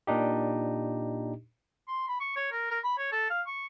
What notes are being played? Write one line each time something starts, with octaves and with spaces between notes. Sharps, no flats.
A#2 D4 D#4 G4
C6
B5
C#6
C#5
A#4
A#4
B5
C#5
A4
F5
C#6